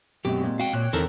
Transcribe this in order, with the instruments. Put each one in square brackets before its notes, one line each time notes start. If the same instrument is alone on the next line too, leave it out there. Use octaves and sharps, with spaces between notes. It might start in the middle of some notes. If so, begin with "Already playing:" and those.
[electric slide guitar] F#2 B2 [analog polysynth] G#3 C4 [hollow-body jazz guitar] G4
[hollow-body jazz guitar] A#2
[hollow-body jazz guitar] F#4 [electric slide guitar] F5 G5
[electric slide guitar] A#2 [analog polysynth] C#5 G5 F#6
[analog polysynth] E2 [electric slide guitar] D#3 E3 C4 [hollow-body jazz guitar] A4 A#4